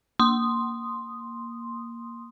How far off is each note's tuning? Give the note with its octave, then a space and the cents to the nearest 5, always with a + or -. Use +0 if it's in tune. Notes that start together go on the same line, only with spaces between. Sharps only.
A#3 +0 C6 +0 D#6 -5